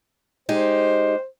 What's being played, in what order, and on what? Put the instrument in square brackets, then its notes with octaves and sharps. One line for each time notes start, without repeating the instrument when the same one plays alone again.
[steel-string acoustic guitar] G#3 D#4 G4 [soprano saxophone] C5